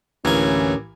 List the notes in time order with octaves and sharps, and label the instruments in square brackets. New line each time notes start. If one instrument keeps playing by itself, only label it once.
[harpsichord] A1 A#3 G#5 [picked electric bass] D2 [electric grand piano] E3 [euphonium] C#4